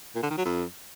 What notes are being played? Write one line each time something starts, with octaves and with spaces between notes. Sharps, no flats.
A#2
D3
D#3
F#3
F2